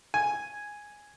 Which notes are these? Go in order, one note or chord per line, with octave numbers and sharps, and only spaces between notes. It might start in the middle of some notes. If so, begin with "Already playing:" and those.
G#5